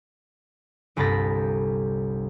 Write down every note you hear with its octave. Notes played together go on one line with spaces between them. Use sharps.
G1 C2 G2 B5 A6 A#6